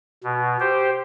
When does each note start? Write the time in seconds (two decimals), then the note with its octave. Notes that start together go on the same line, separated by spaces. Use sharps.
0.24 B2
0.60 G4 C5